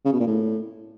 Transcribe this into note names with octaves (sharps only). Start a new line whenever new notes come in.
C#3
B2
A#2
A2